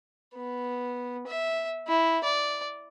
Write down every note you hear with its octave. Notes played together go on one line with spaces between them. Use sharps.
B3
E5
E4
D5